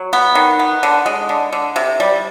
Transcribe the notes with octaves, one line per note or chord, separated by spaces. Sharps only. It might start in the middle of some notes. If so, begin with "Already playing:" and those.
Already playing: F#3
B3
D#3
B3
D3
G#3
D3
D3
C3
G3